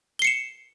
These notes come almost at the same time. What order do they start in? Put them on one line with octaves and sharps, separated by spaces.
G7 C7 C#7 E7